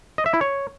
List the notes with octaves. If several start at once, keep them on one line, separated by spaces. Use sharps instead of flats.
D#5
E5
E4
C#5